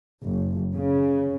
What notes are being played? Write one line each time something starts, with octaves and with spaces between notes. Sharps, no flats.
F#1
C#3